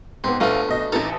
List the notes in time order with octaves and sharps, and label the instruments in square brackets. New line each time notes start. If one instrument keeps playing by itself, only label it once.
[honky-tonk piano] G#2 B3 [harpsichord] C4
[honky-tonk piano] A#1 F5 [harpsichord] A3 B3 D4
[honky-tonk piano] B1 D#5
[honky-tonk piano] A1 E3 A4 [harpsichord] D#4 A5 A#5